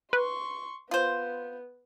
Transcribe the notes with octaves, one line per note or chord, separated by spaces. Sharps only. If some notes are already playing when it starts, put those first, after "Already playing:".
B4 C6 C#6
B3 F4 C5